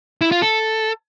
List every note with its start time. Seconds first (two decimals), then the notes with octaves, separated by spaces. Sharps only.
0.21 E4
0.32 F4
0.42 A4